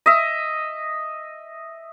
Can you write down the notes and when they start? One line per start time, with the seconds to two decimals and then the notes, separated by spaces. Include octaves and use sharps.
0.06 D#5 E5